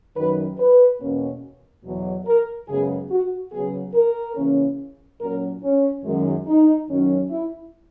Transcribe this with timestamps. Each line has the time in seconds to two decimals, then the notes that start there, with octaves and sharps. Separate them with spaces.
0.16 F#2 D#3 F#3 B4
0.58 B4
1.00 E2 B2 A#3 C#4
1.84 E2 B2 F#3
2.26 A#4
2.68 F#2 C#3 G#3 B3 G#4
3.11 F#4
3.52 C#3 F#3 B3 G#4
3.94 A#4
4.36 C#3 E3 A#3 C#4
5.20 A#2 F#3 C#4 A#4
5.63 C#4
6.04 F#2 D#3 G#3
6.46 D#4
6.88 F#2 D#3 F#3 C#4
7.30 E4